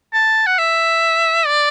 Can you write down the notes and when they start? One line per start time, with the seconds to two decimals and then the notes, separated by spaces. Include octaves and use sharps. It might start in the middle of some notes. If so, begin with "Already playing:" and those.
0.13 A5
0.46 F#5
0.58 E5
1.46 D5